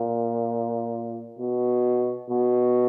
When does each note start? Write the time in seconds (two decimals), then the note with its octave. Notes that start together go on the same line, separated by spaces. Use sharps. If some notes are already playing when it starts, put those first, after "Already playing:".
Already playing: A#2
1.39 B2
2.30 B2